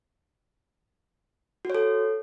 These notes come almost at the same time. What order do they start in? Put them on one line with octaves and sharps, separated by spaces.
F#4 C#5 A4